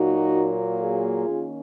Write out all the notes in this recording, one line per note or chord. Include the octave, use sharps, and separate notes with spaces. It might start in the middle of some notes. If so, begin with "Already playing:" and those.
Already playing: A#2 F#3 A#3 D#4 F#4
F4 G#4
D#3 A#3 C#4